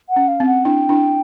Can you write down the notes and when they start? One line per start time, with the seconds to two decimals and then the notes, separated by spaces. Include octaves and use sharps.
0.10 F#5
0.16 C#4
0.28 F5
0.40 C4
0.46 F#5
0.64 D4 E4 G5
0.89 D4 E4